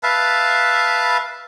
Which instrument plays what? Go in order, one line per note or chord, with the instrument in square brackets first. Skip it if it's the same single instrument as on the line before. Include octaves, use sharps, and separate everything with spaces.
[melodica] B4 E5 F5 A5